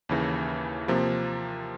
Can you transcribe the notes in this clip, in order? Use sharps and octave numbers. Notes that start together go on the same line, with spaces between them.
D#2 C#3 E3
C3 F3 A#3